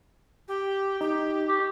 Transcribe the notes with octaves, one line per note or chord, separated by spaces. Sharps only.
G4
D#4 G4
G4